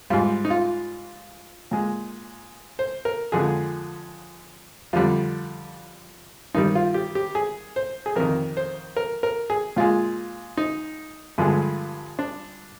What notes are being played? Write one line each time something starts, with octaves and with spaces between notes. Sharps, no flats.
G#2 G3 F4
D#4
F4
A#2 G#3
C5
A#4
F2 D3 F3 G#3 G#4
F2 D3 G3 F4
G2 D#3 G3 D#4
F4
G4
G4
G#4
C5
G#4
F2 C3 D#3 A#4
C5
A#4
A#4
G#4
A#2 G#3 F4
D#4
G2 D3 F3 G#3
D4